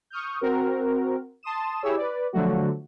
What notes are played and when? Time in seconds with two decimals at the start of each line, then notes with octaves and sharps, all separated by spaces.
0.10 C#6 D#6 F6 G6
0.41 C4 F#4 A#4
1.43 A5 C6 D#6 E7
1.82 E4 G4 G#4 C#5 E6
1.97 B4 D5
2.33 D3 F3 F#3 A3 F#4